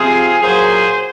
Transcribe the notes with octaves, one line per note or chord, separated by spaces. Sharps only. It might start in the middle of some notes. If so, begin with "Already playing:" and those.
Already playing: C3 F3 C4 F4 G#4
A#2 F#3 A#3 G#4 C5